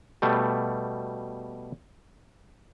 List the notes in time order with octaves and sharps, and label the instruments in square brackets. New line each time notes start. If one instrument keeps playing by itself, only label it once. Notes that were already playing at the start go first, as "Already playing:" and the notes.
[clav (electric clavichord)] B2 G3 A3